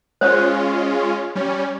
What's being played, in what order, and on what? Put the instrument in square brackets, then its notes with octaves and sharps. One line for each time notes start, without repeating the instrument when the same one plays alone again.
[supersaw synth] G#3 C#4 F4 [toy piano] C5 C#5
[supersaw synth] G3 C#4